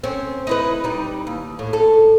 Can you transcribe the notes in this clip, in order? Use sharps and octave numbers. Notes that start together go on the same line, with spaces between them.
C4 C#4
D#4 E4 B4
G3 D#4
D#2
A2
A4